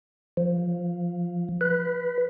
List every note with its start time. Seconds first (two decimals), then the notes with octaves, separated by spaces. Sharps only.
0.37 F3
1.61 B4